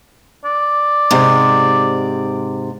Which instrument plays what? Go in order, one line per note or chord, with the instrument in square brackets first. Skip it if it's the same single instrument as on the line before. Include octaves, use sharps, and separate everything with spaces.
[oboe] D5
[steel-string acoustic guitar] G#2 C3